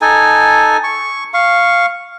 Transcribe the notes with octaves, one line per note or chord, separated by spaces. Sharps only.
D#4 A4 G#5
C#6
F5 C#6